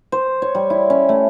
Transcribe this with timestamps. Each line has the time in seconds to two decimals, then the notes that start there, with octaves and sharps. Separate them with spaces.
0.12 C5
0.42 C#5
0.55 G3
0.70 E4
0.90 C#4
1.09 A3